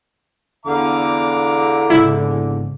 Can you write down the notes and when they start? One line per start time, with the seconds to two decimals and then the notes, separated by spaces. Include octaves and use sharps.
0.66 E2 D3 F5 A#5 D6
1.90 G#1 C#3 E4